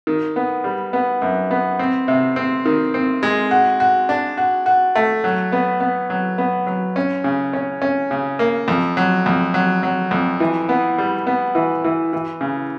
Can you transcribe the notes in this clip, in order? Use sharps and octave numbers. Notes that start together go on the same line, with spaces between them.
D#3
B3
G3
B3
F#2
B3
C4
C3
C4
D#3
C4
G#3
F#4
F#4
D4
F#4
F#4
A3
F#3
B3
B3
F#3
B3
F#3
C#4
C#3
C#4
C#4
C#3
A#3
F2
F#3
F2
F#3
F#3
F2
E3
B3
G3
B3
E3
E3
E3
C#3